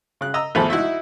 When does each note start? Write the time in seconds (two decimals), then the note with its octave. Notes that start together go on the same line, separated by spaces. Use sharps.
0.21 C#3 F#6
0.34 D#5 A#5 E6
0.55 G#1 E2 F3 A3 A4 B5
0.70 D#4 E4 F#4 E5